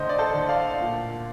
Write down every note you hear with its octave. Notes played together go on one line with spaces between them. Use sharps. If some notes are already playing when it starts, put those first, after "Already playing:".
Already playing: A2 D3 C5 D#5
D5
A4 C5
D3
D5 F5
A#2